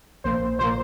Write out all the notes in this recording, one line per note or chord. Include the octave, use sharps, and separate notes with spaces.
A#1 A#2 A#3 C5
A#1 A#2 A#3 C5